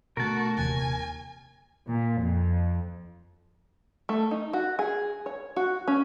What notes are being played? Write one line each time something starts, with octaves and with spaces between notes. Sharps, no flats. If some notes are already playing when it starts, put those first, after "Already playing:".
B2 D3 A3 F#4 A#4 A5
D#1 D#2 C3 E3 G#5
A#2
F2
A3
D#4
F#4
G#4
C#5
F#4
C#4